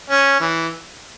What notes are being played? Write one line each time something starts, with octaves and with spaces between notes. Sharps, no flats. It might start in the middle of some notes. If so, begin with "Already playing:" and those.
C#4
E3